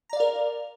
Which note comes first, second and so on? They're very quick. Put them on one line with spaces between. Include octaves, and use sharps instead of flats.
A#5 D5 F5 A#4